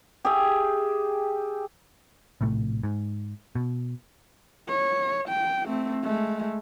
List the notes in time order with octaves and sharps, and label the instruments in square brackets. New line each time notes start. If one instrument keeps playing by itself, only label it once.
[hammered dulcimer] G4 G#4 E5
[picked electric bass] A#1 A2 C3 A3
G#2
B2
[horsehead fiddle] C#5
G5
A3 C4
G#3 A3